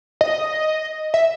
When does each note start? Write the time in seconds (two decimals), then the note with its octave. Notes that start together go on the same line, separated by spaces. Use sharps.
0.21 D#5
1.14 E5